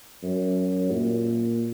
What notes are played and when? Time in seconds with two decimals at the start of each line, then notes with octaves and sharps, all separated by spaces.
0.23 F#2
0.92 A#2